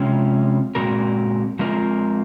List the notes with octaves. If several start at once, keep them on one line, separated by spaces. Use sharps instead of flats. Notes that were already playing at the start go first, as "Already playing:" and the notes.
Already playing: C3 F3 G#3 C#4
A#2 G#3 C4 F#4 A#4
F3 G#3 C4 F4 A#4